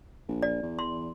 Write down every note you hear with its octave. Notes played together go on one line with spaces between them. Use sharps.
A#1
D5
E2
C6